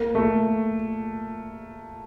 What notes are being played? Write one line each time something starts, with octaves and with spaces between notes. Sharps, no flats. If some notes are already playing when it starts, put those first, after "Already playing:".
Already playing: A#3
A3